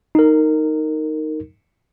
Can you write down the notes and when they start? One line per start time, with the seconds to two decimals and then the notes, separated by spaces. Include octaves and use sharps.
0.15 D#4 A#4